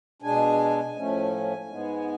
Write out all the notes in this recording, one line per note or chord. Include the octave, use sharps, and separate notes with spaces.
B2 G#3 D4 G#5
A2 F3 A3 C#4
G#2 G#3 B3